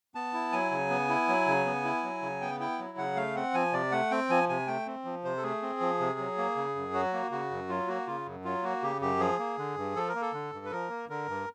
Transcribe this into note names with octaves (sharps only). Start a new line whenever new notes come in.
B3 A5
E4
F#3 G#5
C#3
B3
E4
F#3
C#3
B3
E4
F#3
C#3
B3 G5
E4 G5
F#3
C#3 F#5
A3 F5
C4 F#5
F3 G#5
C3 D5
A3 F#5
C4 G5
F3 G#5
C3 G#5
A3 G5
C4
F3
C3 C5
A4
A3 G#4
C4
F3
C3
F#3
A#3
C#3
F#2
F#3 F#4
A#3
C#3 F#4
F#2
F#3 F4
A#3 F#4
C#3 F4
F#2
F#3 F4
A#3 F#4
C#3 G4
F#2 G4
F3 G#4
A#3
D3
G2
F3 A4
A#4
A#3
A4
D3
G2
B4
F3 A#4
A#3
D3 A#4
G2